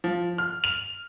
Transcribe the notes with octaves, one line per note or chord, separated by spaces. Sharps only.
F3
F6
F7